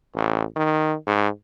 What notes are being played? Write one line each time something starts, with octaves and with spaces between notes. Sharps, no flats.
A1
D#3
G#2